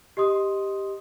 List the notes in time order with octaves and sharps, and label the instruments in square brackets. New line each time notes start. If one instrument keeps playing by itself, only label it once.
[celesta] G4 D#5 C6 D#6